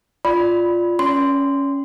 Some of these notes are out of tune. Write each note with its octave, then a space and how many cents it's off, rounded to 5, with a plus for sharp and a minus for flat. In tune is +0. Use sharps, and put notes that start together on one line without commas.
F4 +0 D5 +0 B5 +0
C#4 +0 D5 -45 C6 -15